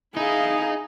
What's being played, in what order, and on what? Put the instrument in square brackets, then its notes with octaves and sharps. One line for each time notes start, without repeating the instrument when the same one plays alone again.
[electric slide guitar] D#4 [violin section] E4 F5 [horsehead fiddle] G#4